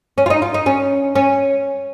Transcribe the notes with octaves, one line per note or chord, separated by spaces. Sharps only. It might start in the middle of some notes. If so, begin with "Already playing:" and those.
C#4
F4
D#4
F4
D#4
C#4
C#4